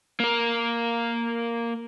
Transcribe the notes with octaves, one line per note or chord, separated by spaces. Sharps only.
A#3 A#4